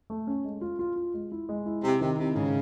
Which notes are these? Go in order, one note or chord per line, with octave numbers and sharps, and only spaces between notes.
A3
C#4
G#3
F4
F4
F4
G#3
E4
G#3
E4
C3 E4
C3 D#3
C3 E4
G#2 C#3